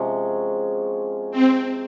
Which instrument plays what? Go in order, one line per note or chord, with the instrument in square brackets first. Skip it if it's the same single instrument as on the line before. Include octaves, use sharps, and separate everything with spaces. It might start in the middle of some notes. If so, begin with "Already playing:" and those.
Already playing: [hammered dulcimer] C3 F3 G#3 C#4
[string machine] C4